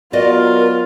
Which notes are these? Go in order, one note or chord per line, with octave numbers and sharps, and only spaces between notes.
F#3 B3 F4 F#4 A#4 D5 D#5